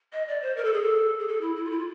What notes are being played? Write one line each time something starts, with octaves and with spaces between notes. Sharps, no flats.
D#5
D5
C5
A#4
A4
G#4
A4
G#4
A4
E4
E4
F4
E4
F4